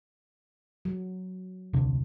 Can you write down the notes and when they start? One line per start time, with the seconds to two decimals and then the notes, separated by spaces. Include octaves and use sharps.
0.85 F#3
1.73 D#1 C2 D3